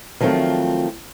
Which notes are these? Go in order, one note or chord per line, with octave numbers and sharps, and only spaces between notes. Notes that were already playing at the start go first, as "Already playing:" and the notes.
D#3 F3 F#3 A3 C4 F4